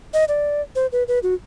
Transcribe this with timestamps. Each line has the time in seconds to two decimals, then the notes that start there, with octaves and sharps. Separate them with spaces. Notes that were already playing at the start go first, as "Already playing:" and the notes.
0.14 D#5
0.28 D5
0.76 C5
0.92 B4
1.08 B4
1.23 F#4